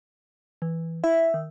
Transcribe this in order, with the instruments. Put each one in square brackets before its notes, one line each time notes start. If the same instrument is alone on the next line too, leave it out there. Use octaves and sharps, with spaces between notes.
[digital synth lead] E3
[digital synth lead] E4 [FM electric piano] E5
[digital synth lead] D#3